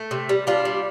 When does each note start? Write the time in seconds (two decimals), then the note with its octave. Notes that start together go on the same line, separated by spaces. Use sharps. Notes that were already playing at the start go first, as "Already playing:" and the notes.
Already playing: A3
0.11 C3
0.29 G3
0.47 G3 D4 F4
0.65 G3